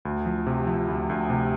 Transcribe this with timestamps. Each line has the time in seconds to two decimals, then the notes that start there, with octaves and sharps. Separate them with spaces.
0.05 D2
0.26 F3
0.47 C3
0.67 F3
0.88 D2
1.09 D2
1.30 C3